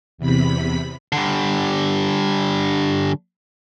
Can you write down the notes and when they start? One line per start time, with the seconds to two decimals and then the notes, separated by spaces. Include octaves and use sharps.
0.18 E2 C3 B5 B6
1.12 D3 G3